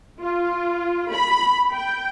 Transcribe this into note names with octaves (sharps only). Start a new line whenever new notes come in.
F4
B5
G5